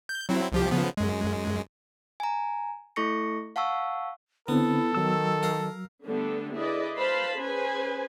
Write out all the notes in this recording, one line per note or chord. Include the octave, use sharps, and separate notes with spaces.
G6
F#3 C4 E4
C2 F3 G4
C#3 F3 B3
F#2 G#3
G#5 A#5
A3 E4 A4 C#6 A#6 C#7
F5 F#5 A5 C#6 E6
D3 B3 C4 E4 A4
D#3 F#3 E6
A#4 F5
D3 G3 A3 B3 D4 A4
E4 G#4 B4 D5 D#5
B4 C5 F5 A5 B5 C6
C#4 G#4 B4 C5 G#5